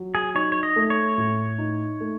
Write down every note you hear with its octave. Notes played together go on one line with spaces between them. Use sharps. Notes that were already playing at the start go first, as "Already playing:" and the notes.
Already playing: F#3
G#4
D#4 C#5
C#5
D#5
A3
C#5
A2
D#4
A3